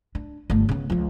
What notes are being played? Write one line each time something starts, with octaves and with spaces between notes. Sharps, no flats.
D4
G1 A3
C#3 B3
C#2 F3